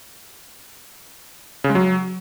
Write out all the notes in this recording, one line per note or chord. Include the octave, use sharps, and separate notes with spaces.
C#3
G#3
F#3